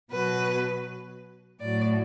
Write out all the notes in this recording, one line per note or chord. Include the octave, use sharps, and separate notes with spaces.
B2 F#3 B4
A2 F#3 D5